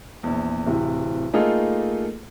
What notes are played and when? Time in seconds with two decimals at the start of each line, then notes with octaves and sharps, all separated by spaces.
0.23 A#1 E2
0.66 D1 C3 E3
1.33 A3 A#3 D#4 F4 G#4 A4